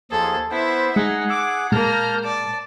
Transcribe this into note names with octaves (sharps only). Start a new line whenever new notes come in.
D#2 F3 G#4 A4
B3 E4 C5 E5
G#3 D#4 G#4 F#5
D6 E6
A#2 G#3 A#3 A5 A#5 F6 G6
D5 A5